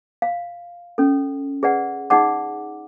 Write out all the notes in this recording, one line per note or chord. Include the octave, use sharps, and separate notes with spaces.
F5
C#4 A4
G#4 B4 D5 F#5
D#4 G#4 D5 F#5 D6